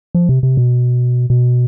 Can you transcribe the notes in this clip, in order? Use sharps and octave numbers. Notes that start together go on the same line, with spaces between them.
F3
C3
C3
B2
B2